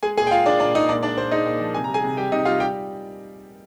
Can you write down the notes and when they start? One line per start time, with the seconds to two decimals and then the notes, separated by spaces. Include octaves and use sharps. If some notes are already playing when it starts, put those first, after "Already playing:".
0.03 G#3 G#4 G#5
0.17 A#2 G#4 G#5
0.27 G5
0.31 G#3 F4 F5
0.46 G#3 D4 D5
0.60 A#2 D4 D5
0.75 G#3 D#4 D#5
0.89 A#2 D4 D5
1.03 G#3 D4 D5
1.17 A#2 C5
1.31 G#3 D#4 D#5
1.46 A#2
1.60 F3
1.74 C3 G#5
1.84 G3 A#5
1.94 G#4 G#5
2.03 C3
2.17 G3 G4 G5
2.32 C3 D#4 D#5
2.45 G3 F4 F5
2.60 G3 G4 G5